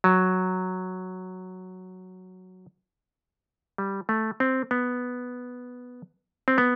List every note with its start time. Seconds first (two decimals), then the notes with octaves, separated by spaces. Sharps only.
0.04 F#3
3.78 G3
4.09 A3
4.40 C4
4.71 B3
6.48 C4
6.58 B3